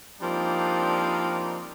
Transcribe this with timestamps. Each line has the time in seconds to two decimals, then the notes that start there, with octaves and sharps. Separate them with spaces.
0.21 F3 G3 A#3 C4 D4 D#4